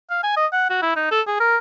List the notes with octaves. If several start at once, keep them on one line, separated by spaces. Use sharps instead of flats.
F5
G#5
D#5
F#5
F#4
E4
D#4
A4
G#4
A#4